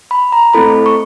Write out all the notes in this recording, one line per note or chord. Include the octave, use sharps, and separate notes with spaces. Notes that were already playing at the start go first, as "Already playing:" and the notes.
B5
A#5
A3 C4 E4 A4 B5
C#6